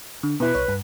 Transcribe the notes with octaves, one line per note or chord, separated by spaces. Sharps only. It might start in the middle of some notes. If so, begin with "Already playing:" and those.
D3
B2 E4 B4
C2 C#5
G2